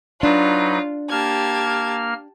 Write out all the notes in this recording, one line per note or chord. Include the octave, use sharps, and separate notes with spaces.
F#3 D4 D#4 F4 B4
A#3 G4 A5 F6 G#6